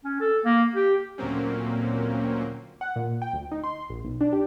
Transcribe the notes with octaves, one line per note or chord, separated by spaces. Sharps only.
C#4
A4
A#3
G4
D2 A#2 F#3 A#3 C4 C#4
F#5
A#2
G5
D2
D#4
C6
A#1
B1
D4
G4